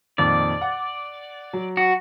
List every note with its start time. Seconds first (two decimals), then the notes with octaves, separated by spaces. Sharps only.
0.18 F2 A#2 D#3 D5
0.61 F#5
1.53 F#3
1.77 F#4